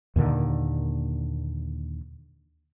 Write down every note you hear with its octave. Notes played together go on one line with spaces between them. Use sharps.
D#2 A#2 D3 D#3